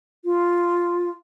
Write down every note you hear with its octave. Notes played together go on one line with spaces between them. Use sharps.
F4